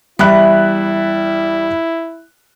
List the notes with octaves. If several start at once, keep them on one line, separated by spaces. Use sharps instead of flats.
E2 G3 E4 E5 B5 F#6